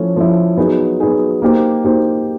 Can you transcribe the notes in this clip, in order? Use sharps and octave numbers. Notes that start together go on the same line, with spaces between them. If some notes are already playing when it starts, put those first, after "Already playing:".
Already playing: F3 A3 C#4 E4
F3 A3 C#4 E4
F#3 B3 D#4 G#4
F#3 B3 D#4 G#4
A#3 D#4 G4 C5
A#3 D#4 G4 C5